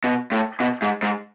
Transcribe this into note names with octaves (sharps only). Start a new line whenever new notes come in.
B2
A2
B2
G#2
G#2